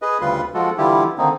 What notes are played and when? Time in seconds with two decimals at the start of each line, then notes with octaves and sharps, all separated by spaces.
0.02 G#4 B4 D#5
0.21 D2 C#3 G3 F4 B4 C6
0.54 F3 G#3 F4 F#4 A4
0.78 D3 E3 G3 E4 F4 G4
1.18 D3 D#3 A#3 C4 D#4